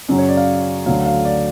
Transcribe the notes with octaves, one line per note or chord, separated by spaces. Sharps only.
F#2 C#3 F#3
C#5
D5
F5
D2 D3 F#3 F5
F5
D5